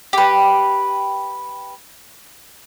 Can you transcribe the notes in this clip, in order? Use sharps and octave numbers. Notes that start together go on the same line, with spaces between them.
G4 B4